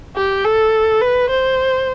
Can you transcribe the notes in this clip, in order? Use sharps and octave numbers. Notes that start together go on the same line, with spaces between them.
G4
A4
B4
C5